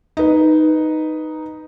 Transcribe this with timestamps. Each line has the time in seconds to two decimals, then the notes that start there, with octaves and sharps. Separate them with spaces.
0.17 D#4 B4